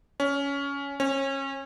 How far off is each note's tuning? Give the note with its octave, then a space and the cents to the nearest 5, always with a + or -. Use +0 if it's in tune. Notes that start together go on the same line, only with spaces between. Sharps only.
C#4 +15
C#4 -30